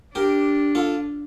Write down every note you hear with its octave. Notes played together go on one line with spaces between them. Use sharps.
D4 G4 A#4
F4 A4